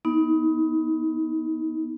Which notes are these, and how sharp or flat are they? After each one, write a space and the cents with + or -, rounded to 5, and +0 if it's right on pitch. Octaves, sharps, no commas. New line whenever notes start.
B3 +0 D#4 +25